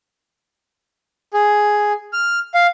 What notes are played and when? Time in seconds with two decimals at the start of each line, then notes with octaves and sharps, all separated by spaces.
1.34 G#4
2.13 F6
2.54 F5